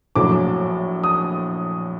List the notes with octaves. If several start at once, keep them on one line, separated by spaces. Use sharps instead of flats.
A#1 A2 F#3 D6
D#6